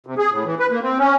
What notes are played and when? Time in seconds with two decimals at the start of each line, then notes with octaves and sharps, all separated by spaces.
0.07 C3
0.18 G#4
0.31 A2
0.45 E3
0.59 B4
0.71 A#3
0.83 C4
0.98 C#4